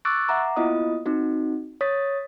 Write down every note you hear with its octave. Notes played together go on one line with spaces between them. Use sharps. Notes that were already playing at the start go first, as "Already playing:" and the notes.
C#6 D6 E6 F#6 A6 D7
E5 F#5 A#5 D6
A#3 B3 E4 F4 D#5 D#6
C4 D#4 F#4
C#5 D#6 A6 B6